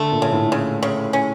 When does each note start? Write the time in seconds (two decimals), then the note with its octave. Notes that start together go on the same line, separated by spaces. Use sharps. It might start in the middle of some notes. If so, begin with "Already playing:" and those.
Already playing: D3 A3
0.12 A#2
0.22 C#3
0.32 A2
0.52 C#3
0.83 C#3
1.13 C#4